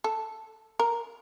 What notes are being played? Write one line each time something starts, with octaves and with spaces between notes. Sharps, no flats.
A4
A#4